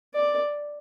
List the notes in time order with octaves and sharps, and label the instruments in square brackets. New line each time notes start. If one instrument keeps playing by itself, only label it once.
[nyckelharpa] D5